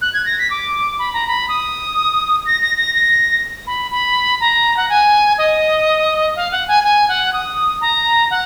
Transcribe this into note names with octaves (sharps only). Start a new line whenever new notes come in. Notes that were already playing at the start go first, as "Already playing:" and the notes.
F#6
G#6
A#6
B6
D6
B5
A#5
B5
D#6
A#6
A#6
A#6
A#6
B5
B5
A#5
F#5
G#5
D#5
F5
F#5
G#5
G#5
F#5
D#6
A#5
F#5